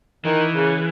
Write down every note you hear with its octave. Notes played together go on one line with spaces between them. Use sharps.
D#3 E3
C#3